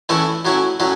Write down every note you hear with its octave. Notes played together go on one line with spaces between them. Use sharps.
A2 E3 A3 C#4 E4
A2 F#3 C#4 E4
A2 F#3 C#4